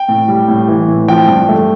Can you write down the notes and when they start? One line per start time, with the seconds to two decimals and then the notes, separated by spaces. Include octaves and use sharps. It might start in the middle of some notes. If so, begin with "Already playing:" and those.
Already playing: G5
0.08 A2
0.28 G3
0.48 A2
0.68 E3
0.88 A2
1.08 F3 G5
1.28 G2
1.49 A3